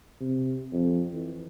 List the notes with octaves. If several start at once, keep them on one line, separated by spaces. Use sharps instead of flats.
C3
F2
E3